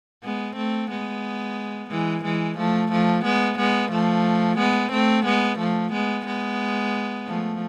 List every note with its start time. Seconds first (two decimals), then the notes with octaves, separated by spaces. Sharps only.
0.24 G#3 B3
0.56 A3 C4
0.91 G#3 B3
1.90 E3 G#3
2.24 E3 G#3
2.58 F3 A3
2.92 F3 A3
3.24 G#3 B3
3.59 G#3 B3
3.91 F3 A3
4.58 G#3 B3
4.92 A3 C4
5.25 G#3 B3
5.59 F3 A3
5.92 G#3 B3
6.26 G#3 B3
7.26 F3 A3